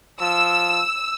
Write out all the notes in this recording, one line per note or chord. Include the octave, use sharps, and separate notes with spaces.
F3 E6